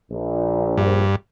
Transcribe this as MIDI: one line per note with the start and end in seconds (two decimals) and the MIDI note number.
0.11 1.02 34
0.77 1.16 43